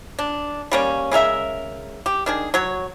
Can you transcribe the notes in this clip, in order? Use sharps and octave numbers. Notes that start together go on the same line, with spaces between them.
D4
G3 A#3 C#4
C#3 G#3 A#4 E5
G4
D#3 D4 G#4
F#3 C#5